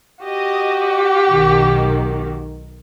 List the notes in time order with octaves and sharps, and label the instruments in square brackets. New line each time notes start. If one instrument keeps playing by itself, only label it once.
[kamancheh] F#4 G4 [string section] D#5
[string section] B1 D#3